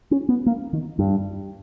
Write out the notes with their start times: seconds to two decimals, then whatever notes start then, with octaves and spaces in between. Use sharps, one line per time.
0.11 C#4
0.29 B3
0.46 A#3
0.73 D#3
0.99 G2